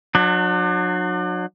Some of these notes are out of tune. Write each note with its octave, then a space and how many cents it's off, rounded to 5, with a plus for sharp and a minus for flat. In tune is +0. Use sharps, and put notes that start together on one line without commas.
F#3 -30 D4 +40